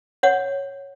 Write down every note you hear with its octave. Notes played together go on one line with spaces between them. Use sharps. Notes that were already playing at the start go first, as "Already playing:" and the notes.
C#5 F#5